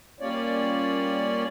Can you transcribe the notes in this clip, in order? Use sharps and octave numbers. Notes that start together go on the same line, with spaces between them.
G3 A#3 C#4 F4 C#5 D5